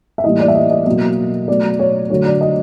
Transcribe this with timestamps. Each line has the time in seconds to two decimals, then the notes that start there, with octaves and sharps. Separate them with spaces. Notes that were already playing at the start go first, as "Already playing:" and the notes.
0.18 E5
0.24 A2 E3 G3 A#3 D#5
0.40 D5
0.48 E5
0.55 D#5
0.70 D#5
0.86 B2 F#3 A#3 D#5
1.48 B2 F#3 A3 D5
1.79 C#5
2.10 D3 F#3 A3 C#5
2.26 D5
2.41 D#5